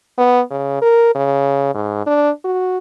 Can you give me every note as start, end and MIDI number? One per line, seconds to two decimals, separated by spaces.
0.18 0.41 59
0.51 0.77 49
0.82 1.14 70
1.15 1.71 49
1.74 2.06 44
2.06 2.30 62
2.45 2.78 66